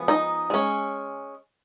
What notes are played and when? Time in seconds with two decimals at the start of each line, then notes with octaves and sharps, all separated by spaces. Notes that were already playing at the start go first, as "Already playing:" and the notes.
Already playing: F3 G#3 B3
0.08 D#4
0.50 G#3 C#4